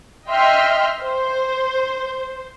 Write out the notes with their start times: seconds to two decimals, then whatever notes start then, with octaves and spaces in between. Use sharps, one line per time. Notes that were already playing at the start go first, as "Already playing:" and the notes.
0.29 D#5 E5 G5 C6 F6
1.02 C5